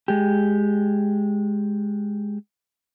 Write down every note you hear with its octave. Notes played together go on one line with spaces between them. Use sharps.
G#3 G4